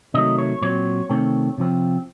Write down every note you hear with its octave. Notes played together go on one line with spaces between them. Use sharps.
C3 D#3 F#3 A3 D#5
C#5
A#2 F#3 C4 C#5
C3 D#3 A3 C4
C3 F3 C4